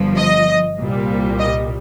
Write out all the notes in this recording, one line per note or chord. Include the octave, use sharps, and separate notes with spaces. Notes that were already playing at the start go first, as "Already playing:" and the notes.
Already playing: G1 G2 F3
D#5
C2 A#2 G3
D#5